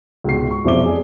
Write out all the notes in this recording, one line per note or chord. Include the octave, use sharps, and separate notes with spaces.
C#2 G#2 B2 F#4 C7
C#6
E1 F2 C5 E5 D6 G7
G#4 D5